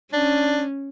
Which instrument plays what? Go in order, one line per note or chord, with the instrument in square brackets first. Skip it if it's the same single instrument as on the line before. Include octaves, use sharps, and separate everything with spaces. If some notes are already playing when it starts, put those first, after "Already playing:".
[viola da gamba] C#4 [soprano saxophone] D4